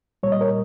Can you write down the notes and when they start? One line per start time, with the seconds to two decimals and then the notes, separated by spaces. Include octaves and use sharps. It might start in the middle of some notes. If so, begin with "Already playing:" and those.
0.23 C2 A#2 G3 C#5
0.32 D#5
0.41 A#4 C#5